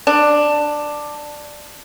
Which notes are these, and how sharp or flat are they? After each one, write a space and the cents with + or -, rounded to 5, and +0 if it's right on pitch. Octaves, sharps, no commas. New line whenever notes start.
D4 +10